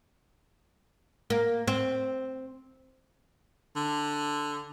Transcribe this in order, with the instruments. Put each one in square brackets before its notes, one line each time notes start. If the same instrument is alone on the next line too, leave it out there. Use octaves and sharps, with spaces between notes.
[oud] A#3
C4
[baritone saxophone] D3